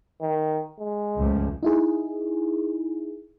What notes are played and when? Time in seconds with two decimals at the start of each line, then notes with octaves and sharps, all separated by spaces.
0.22 D#3
0.79 G#3
1.17 C#2 F3 A3
1.63 D#4 E4 G#4